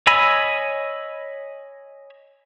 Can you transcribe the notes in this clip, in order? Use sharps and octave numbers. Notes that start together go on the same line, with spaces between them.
C#5 D#5 G#5 B5 E6